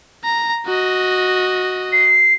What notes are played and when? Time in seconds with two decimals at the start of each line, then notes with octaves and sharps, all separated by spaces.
0.24 A#5
0.66 F#4 D#5
1.92 C7